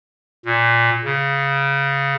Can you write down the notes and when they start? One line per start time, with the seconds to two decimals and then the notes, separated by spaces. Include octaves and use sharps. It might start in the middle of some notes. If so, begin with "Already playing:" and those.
0.45 A#2
1.04 C#3